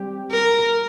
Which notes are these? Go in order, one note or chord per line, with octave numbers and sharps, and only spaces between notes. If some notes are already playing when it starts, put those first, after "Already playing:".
Already playing: G3 C4 G4
A#4